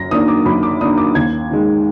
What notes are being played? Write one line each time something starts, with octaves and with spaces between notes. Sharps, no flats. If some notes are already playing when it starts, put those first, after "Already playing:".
Already playing: F#2 A#6
D#3 A#3 D4 D#6
D6
F#2 B5
D6
D#3 A#3 D4 D#6
D6
D#2 G#6
D#3 G#3